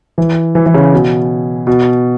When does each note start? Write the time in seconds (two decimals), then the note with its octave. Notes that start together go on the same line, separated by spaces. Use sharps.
0.18 E3
0.55 E3
0.66 E3
0.74 C#3
0.93 B2
1.67 B2